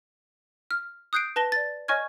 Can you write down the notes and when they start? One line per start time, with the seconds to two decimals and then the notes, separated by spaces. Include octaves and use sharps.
0.71 F6
1.13 D#6 F#6 G6 C7 D7
1.36 B4 A5 A#6 G7
1.52 D5 A6
1.88 C#5 D#5 G#5 C#6 F6 G#6